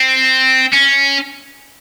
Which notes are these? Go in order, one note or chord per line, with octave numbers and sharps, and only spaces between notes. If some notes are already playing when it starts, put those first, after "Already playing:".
Already playing: C4
C#4